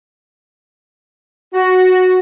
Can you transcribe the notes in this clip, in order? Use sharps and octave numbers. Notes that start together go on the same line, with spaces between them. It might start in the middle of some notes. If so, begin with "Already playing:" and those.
F#4